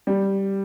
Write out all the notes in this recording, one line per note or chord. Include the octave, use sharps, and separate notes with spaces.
G3